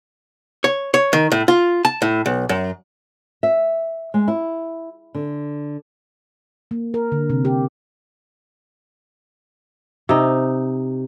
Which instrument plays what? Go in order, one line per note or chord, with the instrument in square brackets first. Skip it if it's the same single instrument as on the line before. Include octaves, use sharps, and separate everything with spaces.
[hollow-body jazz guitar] C#5
C#5
D#3
A2
F4
A5
A2
B1
F#2
[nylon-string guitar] E5
G#3
E4
D3
[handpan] A#3
A#4
D3
C3
G4
[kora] C3 D#4